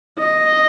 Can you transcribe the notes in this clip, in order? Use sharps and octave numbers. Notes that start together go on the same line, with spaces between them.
D#5